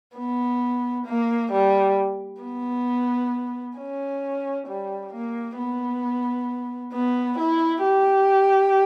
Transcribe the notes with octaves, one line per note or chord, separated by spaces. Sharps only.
B3
A#3
G3
B3
C#4
G3
A#3
B3
B3
E4
G4